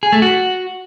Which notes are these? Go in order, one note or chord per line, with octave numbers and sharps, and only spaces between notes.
G#4
A3
F#4